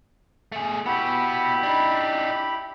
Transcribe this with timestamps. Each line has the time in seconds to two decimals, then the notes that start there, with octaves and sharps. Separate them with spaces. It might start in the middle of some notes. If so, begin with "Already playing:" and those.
0.52 A3 G#4
0.86 B3 E4 F#4 G4 B5
1.63 D4 D#4